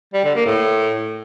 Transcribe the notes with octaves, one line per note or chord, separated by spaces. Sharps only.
G3
D3
A#3
A2